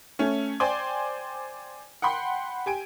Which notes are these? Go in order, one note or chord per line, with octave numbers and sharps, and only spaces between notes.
A3 C#4
C5 D5 G5 G#5 C6 D6
F#5 G5 B5 C6
G4 G#5 D7